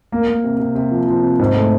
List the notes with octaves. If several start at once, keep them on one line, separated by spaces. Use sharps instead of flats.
A#3
A#3
C3
C3
C3
F3
F3
C3
G#2
A3